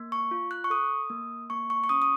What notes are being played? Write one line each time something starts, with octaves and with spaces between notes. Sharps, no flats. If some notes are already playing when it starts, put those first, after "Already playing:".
Already playing: A#3
C#6
F4
F#6
C#6
A4 D#6
A#3
A#3 C#6
C#6
C#6
C#4 D#6
D#6